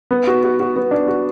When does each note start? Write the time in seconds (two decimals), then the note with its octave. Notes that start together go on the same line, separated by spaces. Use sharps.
0.11 B3
0.27 F#4
0.43 F#4
0.60 F#4
0.76 B3
0.91 D4
1.08 F#4